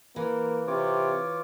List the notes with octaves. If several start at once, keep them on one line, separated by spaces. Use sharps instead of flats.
E3 A#3
C3 F4 C#5 D6